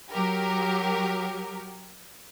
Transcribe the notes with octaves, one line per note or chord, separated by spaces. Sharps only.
F#3 G4 A#4